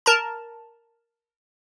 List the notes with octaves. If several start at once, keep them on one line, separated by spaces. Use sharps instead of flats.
A#4 A5 A#5